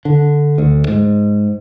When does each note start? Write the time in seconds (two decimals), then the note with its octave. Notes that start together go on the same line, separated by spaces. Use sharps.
0.05 D3
0.58 D2
0.88 G#2